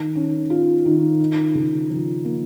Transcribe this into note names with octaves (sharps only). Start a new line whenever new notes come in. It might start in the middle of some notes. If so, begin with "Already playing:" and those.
Already playing: D#3
C#4
F4
D#3
D#4
C#3
F3
A#3